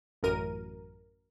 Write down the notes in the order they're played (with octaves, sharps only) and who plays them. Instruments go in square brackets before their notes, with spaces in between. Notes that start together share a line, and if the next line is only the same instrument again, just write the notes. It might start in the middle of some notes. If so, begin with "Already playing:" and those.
[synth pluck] A1 F#2 A#4 D#7